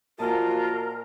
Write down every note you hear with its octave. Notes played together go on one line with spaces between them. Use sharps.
A#2 F3 F4 F#4 A#4 D#5 A5